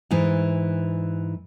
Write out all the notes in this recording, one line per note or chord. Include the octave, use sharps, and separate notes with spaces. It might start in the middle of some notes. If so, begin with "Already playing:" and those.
G#2 E3